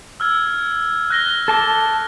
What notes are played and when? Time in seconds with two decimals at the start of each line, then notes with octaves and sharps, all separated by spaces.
0.20 E6 F6 G#6
1.10 F#6 A#6 G7
1.48 A4 A5 D6